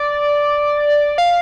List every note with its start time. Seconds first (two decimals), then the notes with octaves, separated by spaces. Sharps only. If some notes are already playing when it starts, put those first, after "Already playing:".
Already playing: D5
1.18 F5